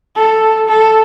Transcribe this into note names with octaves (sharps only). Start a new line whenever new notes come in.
A4
A4